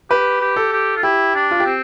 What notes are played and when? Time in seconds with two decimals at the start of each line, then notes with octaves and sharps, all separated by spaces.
0.10 G4 B4
0.41 G4
0.56 A4
0.73 G4
0.96 F4
1.03 E4 G4
1.35 D4
1.51 F4
1.60 G4
1.66 C4